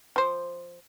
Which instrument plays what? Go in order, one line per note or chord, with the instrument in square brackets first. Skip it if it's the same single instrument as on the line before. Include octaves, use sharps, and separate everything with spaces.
[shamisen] F3 C5